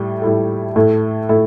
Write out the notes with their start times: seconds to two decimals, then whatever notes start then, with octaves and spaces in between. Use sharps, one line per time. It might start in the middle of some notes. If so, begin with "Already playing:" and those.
Already playing: A2 G3
0.22 A2 G3 E4 A4
0.76 A2 A3 E4 A4
1.29 A2 A3 E4 A4